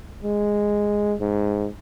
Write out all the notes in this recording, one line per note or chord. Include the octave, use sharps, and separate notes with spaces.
G#3
G#2